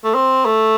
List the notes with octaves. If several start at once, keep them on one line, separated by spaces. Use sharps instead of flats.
A3
C4
A3